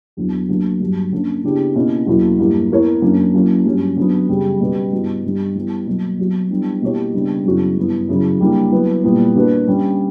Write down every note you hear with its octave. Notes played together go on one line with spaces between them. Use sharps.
E2 D3 F#3 B3
D3 F#3 A#3
G2 D3 F#3
D3 A#3 C#4
C#3 E3 B3 D4 G4
B2 A#3 C#4 E4
E2 B2 F#3 A#3 E4
G2 E3 A#3
E3 B3 E4 A#4 C#5
F#2 D3 A#3 C#4
F#3 A#3 C#4 E4
G2 F#3 C#4
D3 F#3 B3
F#2 C#3 G3 C#4 G4
B2 G3 C#4 G4 B4
G2 E3 B3 F#4
G2 D3 G3
E3 G3 B3
B2 F#3 A#3
F#3 B3 F#4
E3 G3 B3 D4
B2 A#3 E4 G4 C#5
C#3 G3 B3 D4
F#2 C#3 E3 B3 F#4
G2 E3 B3
F#2 C#3 E3
D3 G3 A#3 E4
F#3 B3 E4 B4
A#2 G3 B3 E4 B4
D3 A#3 D4 F#4 B4
D3 G3 C#4